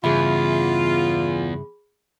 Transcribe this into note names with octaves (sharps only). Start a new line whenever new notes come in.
E2 G2 C#3 F4 G#4 E5 B5